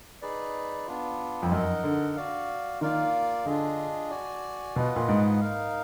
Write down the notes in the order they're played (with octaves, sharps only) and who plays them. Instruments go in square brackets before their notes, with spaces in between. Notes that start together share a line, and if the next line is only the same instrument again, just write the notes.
[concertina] D#4 G#4 B4 D5
B3 D4 F4
[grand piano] F2
[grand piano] F#2 [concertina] D#4 A#4 D#5 F#5
[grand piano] D3
[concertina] F#4 D5 F5
[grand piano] D#3 [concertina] A#3 F4 A#4 D5 F5
[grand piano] D3 [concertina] D4 F4 G#4 D#5
[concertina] F#4 D5 G#5
[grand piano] B2 [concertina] F4 B4 D#5 F#5
[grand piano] A#2
G#2
[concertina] D#4 A#4 F5